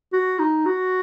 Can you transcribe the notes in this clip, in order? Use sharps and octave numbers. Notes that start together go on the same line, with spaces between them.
F#4
D#4
F#4